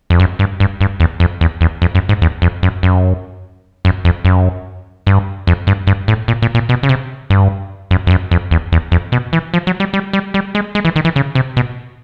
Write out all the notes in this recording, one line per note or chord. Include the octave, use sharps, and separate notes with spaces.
F2
F#2
G2
G2
G2
E2
F2
E2
E2
F2
F#2
G#2
E2
F2
F#2
F#2
F#2
F2
F#2
G2
F2
G2
G2
A2
A#2
A#2
A#2
B2
C#3
C3
G2
F#2
F2
F#2
F2
E2
E2
F2
B2
E3
F3
F#3
G3
G3
G3
G3
G#3
G#3
E3
D#3
E3
C#3
C3
B2